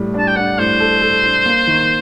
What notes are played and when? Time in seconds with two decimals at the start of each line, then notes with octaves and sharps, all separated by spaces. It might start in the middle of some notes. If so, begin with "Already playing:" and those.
Already playing: A2 G3
0.14 D4 A5
0.27 G5
0.36 D4 F#5
0.58 A2 C5
0.80 A4
1.02 A4
1.24 D4
1.46 A#3
1.67 D#3